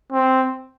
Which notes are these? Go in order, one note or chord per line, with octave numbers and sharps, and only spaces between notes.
C4